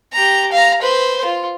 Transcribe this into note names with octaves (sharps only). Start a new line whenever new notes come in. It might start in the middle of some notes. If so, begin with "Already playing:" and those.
G4 A#5
F5 A#5
B4 C5
F4